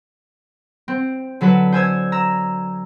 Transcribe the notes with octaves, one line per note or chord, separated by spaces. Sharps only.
C4
D3 F#3 A4 B4
C5 G#5 E6 G#6
A#5 E6